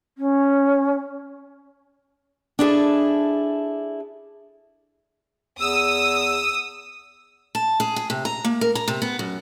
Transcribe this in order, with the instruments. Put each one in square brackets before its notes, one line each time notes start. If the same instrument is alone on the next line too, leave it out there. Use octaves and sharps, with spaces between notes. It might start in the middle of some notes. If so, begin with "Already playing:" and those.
[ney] C#4
[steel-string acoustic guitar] D4 E4 G#4 A4
[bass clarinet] E2 [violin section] D#6 [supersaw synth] E6
[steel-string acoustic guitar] A5
G#4
G#4
C3
A#5
A#3
A#4
A#5
C3
B3
F#2